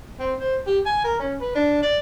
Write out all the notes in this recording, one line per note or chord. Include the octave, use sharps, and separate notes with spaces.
C4
C5
G4
G#5
A#4
C#4
B4
D4
D5